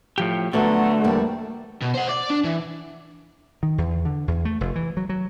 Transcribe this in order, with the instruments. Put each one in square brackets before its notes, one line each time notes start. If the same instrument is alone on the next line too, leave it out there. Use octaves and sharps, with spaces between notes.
[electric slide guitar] A2 F3 G4
[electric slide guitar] D3 [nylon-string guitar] F#3 B3 F#4 [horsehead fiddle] A3
[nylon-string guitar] E2 G3 A#3
[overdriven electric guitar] B2
C5 F#5
D5
D4
E3
[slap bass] D#3
E2
D3
E2
A3
F1
E3
F#3
F#3